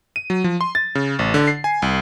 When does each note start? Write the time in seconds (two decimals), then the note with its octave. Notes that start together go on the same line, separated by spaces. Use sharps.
0.16 D#7
0.30 F#3
0.44 F3
0.61 C6
0.75 A6
0.95 C#3
1.19 A1
1.34 D3
1.48 C7
1.64 G#5
1.82 C2